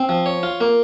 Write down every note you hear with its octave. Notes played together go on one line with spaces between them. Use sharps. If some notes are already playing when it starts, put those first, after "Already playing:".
Already playing: C4
F3
C#5
F4
A#3